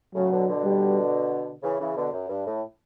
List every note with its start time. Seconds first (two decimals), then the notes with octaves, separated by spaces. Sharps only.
0.15 A2 C#3 F#3
0.31 B2 D3
0.48 B2 D3
0.64 G3
1.63 C#3 E3
1.80 C#3 E3
1.97 B2 D3
2.13 F#2
2.29 G2
2.47 A2